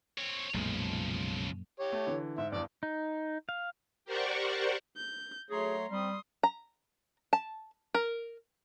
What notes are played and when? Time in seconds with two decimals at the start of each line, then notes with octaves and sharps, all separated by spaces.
0.18 C4 C#5
0.54 B1 F#2 A#2 C#3 F3 G#3
1.80 G4 C#5
1.92 A3
2.07 D3 E3
2.38 G#2 E5
2.52 E2 G2 D5
2.83 D#4
3.49 F5
4.05 G4 A#4 C5 D5 F#5 C#6
4.97 G6
5.50 F#3 A3 G#4 C#5 A#5 C6
5.91 G3 C4 C6 D#6
6.43 A#5
7.33 A5
7.94 A#4